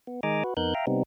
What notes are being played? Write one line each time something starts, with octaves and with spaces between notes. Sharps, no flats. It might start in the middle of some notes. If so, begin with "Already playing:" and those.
B3
D#3 G#3 D#5 G#5 A#5 D6
F#4 B4
F2 B3 D#4 A#4 F#6 G6
E5 F5 G5 A#5
C3 G3 B3 C4 D#4